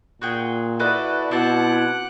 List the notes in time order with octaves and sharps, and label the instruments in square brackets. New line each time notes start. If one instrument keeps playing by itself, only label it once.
[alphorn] A#2 [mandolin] F#4 G#4 G5
[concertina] E4 F#4 [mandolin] A4 B4 D#5 [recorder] D5
[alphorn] B2 [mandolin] C4 A5 [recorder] E4 [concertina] F#5 D6 F#6